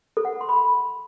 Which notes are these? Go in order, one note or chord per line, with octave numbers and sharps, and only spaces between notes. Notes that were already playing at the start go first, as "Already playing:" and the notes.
A4
F#5
A4
C6
B5